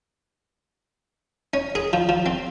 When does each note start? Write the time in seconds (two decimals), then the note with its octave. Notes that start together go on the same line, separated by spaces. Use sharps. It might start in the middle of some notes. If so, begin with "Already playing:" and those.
1.54 C#4
1.75 G#4
1.93 F3
2.09 F3
2.26 C4